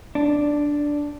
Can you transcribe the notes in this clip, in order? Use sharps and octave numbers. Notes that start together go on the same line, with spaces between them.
D4